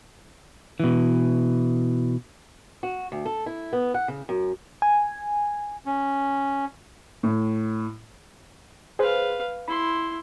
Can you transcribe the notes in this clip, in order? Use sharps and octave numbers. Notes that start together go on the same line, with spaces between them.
B2 E3
F#4
D2
A4
E4
B3
F#5
C#3
F#2
G#5
C#4
A2
G#4 B4 C5 F5
E4 B5 C6